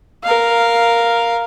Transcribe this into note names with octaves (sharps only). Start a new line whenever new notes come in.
A#4 F5